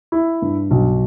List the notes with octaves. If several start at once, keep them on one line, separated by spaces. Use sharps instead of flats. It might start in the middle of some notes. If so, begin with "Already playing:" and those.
E4
G2
B1